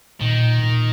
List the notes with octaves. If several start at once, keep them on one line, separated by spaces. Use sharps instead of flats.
A#2 D#3
A#2